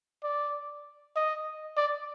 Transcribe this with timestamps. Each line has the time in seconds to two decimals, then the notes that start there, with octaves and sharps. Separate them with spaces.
0.23 D5
1.16 D#5
1.77 D5